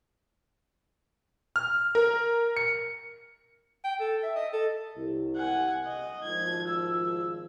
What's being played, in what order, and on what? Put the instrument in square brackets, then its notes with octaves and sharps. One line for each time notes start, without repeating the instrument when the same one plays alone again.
[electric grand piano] F6
A#4
C#7
[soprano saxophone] G5
A4
E5
D#5
A4
[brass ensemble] C2
[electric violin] F#5 G#5
D#5
[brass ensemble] G#1 F3 [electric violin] G#6
[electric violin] E6